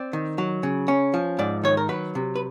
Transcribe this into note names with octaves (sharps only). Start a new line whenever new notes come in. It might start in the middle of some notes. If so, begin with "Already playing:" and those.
Already playing: C4 D5
D#3
F#3
C#3
C#4
F3
G#2 D5
D#3 C#5
A#4
F#3 B4
C3
B4